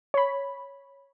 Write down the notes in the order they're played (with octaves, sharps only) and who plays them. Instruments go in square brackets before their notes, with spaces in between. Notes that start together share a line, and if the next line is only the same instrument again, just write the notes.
[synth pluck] C#5 B5